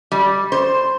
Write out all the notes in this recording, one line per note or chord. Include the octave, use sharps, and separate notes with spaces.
G3
C5